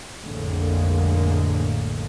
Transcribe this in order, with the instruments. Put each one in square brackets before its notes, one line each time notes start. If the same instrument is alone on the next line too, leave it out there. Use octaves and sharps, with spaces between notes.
[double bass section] A#1 F2 A2 D3 G#3 A#3